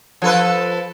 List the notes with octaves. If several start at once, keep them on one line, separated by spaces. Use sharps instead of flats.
F3 A4 B4